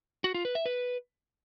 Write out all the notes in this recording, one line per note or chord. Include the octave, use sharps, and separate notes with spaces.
F#4
F4
B4
E5
B4